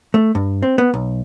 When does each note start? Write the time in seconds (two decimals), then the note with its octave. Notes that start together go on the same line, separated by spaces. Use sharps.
0.14 A3
0.35 G2
0.63 C4
0.78 B3
0.94 B1